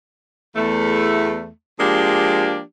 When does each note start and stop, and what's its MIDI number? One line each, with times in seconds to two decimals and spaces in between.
0.56 1.49 40
0.56 1.49 57
1.80 2.60 53
1.80 2.60 56
1.80 2.60 58
1.80 2.60 62
1.80 2.60 67